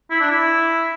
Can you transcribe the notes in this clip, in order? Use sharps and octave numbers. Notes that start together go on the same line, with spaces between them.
E4
D4
E4